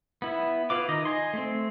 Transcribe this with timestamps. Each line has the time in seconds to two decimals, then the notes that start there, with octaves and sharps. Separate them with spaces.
0.22 B3 E4
0.70 E4 F4 B4 D6
0.89 D#3 D#4 D#5
1.05 D#5 G#5 C6
1.33 A3 C4